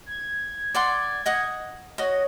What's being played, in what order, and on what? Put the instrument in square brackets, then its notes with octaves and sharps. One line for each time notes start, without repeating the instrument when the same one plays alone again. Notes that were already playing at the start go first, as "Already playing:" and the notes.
[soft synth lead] G#6
[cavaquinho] D5 F#5 C6
D#5 F#5 D#6
[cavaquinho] F#4 D#5 [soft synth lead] C#5